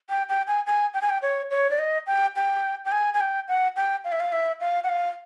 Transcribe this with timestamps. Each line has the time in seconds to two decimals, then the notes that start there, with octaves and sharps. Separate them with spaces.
0.10 G5
0.29 G5
0.47 G#5
0.67 G#5
0.94 G5
1.01 G#5
1.09 G5
1.22 C#5
1.51 C#5
1.70 D5
1.78 D#5
2.07 G5
2.36 G5
2.85 G5
2.92 G#5
3.14 G#5
3.20 G5
3.48 F#5
3.76 G5
4.04 F5
4.12 E5
4.20 F5
4.32 E5
4.60 F5
4.84 F#5
4.89 F5